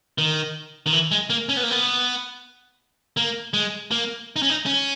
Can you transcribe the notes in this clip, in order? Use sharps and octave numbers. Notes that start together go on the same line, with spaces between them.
D#3
D#3
E3
G#3
A#3
C#4
B3
A#3
B3
A#3
G#3
A#3
D#4
C#4
D#4
C#4